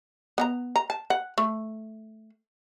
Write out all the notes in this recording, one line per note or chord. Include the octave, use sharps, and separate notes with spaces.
B3 D#5 A#5
A#5
A5
F#5
A3